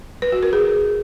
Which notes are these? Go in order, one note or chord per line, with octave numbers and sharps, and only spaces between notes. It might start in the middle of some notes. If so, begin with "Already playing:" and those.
B4
F#4
A#4
G#4